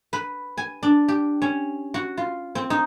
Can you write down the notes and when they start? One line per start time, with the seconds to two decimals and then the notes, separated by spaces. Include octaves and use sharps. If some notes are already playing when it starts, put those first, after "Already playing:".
0.13 B4
0.57 G#5
0.83 D4
1.08 G4
1.42 C#4
1.94 F#4
2.17 F4
2.55 C4
2.70 D#4